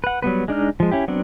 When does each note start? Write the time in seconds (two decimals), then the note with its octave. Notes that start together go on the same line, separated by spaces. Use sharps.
0.04 B4 F#5
0.22 F#3 G3 B3 B4
0.48 G#3 D4 D#4 F6
0.80 F3 G#3
0.91 C#4 E4 G4
1.08 F#3 B3 C4 D4